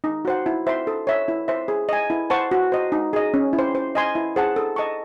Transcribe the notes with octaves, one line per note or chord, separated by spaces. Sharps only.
D#4
F#4 C5 F#5
E4
C5 E5 C6
A4
C#5 E5
E4
C5 E5
G#4
D#5 G#5
E4
C5 F#5 A5 C#6
F#4
C5 D#5
D#4
G#4 D#5
C#4
E4
C5
C5
D#5 G#5 C6
E4
G#4 C5 F#5 A5
A4
D#5 A5 C#6